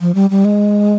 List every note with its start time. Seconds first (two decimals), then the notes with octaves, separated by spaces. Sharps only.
0.01 F3
0.15 G3
0.30 G3
0.45 G#3